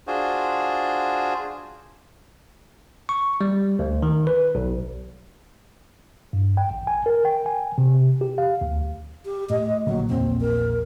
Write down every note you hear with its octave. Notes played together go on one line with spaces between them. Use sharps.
D4 F4 F#4 G#4 C5
C#6
G3
D2
D#3
B4
B1
G2
G5
A1
G#5
A#4
G5
G#5
C3
G4
F5
D2
G4
A2 D#5
A#1 D3 F#3 A#3
A#1 E2 A#3 C4
A#4